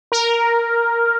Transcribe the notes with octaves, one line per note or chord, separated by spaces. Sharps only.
A#4